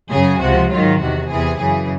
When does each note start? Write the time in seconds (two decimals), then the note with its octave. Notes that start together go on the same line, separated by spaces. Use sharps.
0.12 F#2 C#3 F#3 G#4
0.41 C#2 C3 F3 F#4
0.71 G#2 D#3 F#3 F4
1.00 E2 C3 D#3 F#4
1.30 E2 C3 E3 G#4
1.60 F#2 C#3 E3 G#4